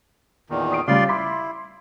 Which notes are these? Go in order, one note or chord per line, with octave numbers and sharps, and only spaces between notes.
E2 A#2 D#3
D#6 C7 D7
C#3 G3 F4 D5 C6
E4 C6 D6 B6